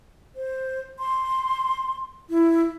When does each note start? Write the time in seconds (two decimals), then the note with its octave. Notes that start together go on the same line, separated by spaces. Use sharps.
0.36 C5
0.99 C6
2.30 E4